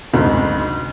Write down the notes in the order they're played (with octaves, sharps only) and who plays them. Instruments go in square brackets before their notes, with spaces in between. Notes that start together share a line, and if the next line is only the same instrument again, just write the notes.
[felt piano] F#1 D2 G#2 C3